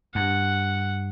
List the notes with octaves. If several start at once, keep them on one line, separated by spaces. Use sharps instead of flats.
G2 F#5